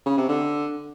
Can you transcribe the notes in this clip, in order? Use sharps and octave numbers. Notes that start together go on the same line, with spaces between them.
C#3
C3
D3